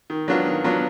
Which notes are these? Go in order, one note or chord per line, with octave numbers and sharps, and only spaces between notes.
D#3
F#3 B3 D4 F4
D#3
F#3 B3 D4 F4